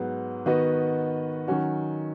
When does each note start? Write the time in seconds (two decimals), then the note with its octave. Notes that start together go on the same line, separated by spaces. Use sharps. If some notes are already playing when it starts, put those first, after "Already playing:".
Already playing: G#2 F#3 B3
0.46 D#3 B3 F#4 B4 D#5
1.47 D#3 F#3 C#4 F#4